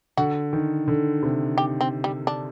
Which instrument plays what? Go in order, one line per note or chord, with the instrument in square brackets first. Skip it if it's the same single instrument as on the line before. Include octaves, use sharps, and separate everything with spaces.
[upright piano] D3 [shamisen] F#4
[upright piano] D#3
D3
C3
[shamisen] G4
C4
G3
D4